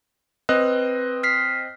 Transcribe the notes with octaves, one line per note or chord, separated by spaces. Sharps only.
C4 B4 D#5 F#6
F6 B6 C7